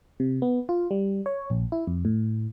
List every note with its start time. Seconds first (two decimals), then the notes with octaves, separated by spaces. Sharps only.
0.20 C3
0.42 B3
0.69 F4
0.91 G3
1.26 C#5
1.50 A#1
1.72 E4
1.87 F2
2.05 A2